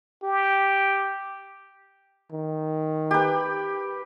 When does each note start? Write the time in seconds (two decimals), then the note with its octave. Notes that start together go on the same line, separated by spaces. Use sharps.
0.23 G4
2.32 D#3
3.11 G4 B4